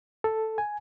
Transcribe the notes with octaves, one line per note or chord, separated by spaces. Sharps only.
A4
G#5